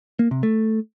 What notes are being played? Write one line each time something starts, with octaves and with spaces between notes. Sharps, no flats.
A#3
C3
A3